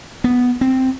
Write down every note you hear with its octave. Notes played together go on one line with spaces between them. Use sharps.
B3
C4